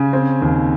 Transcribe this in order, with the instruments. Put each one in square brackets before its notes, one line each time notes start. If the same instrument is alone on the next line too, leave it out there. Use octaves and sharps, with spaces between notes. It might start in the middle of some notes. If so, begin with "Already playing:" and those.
Already playing: [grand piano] C#3 G#5
C4
D#2